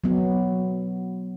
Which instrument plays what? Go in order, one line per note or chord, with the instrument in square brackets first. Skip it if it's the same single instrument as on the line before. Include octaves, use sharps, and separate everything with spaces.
[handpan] F#3 B3